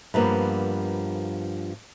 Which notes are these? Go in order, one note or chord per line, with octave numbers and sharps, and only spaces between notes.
G2 F3 A#3 B3